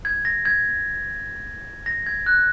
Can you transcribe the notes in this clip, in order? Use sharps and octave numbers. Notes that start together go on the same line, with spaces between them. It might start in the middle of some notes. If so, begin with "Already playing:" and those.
G#6
A#6
G#6
A#6
G#6
F#6